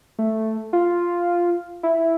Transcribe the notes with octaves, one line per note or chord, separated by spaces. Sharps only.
A3
F4
E4